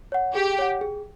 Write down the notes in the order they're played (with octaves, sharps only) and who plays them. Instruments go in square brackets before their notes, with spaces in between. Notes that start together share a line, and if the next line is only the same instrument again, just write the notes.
[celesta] C#5 F#5
[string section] G4 [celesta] G#4
[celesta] C#5 F#5
G#4